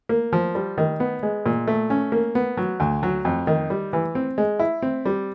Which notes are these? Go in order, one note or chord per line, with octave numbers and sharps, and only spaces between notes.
A#3
F3
G3
D#3
B3
G#3
A#2
A3
C#4
A#3
B3
F#3
D2
F#3
F2
D#3
G3
E3
C4
G#3
E4
C4
G3